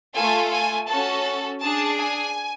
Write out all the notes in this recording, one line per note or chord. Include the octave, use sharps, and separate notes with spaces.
A3 F4 A4 G#5
G#5
C#4 F#4 A4 A5
D4 G#4 A5
G#5